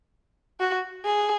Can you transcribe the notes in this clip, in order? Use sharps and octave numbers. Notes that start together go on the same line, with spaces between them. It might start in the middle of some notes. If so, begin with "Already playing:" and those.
F#4
G#4